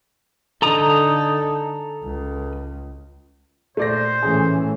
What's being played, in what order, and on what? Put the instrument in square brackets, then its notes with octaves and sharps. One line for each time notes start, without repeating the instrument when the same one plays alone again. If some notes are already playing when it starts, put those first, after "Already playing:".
[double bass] D3 D#4 [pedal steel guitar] A4 A#5 D#6
[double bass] C#2
[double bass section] A#2 [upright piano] A3 D5 A#6 [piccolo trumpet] C5
[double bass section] A1 E3 A3 [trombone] C#4 [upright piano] G#4